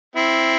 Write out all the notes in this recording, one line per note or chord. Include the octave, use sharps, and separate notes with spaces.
C4 E4